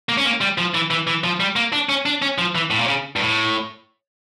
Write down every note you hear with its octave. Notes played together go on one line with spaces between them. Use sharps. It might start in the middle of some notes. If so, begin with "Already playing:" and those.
A#3
C#4
A#3
G3
F3
E3
E3
E3
F3
G3
A#3
D4
C#4
D4
C#4
F3
E3
A2
A#2
C#3
G2
A2